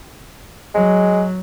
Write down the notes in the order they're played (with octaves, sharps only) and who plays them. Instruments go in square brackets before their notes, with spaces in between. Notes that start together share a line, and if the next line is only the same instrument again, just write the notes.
[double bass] F#3 [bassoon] G#3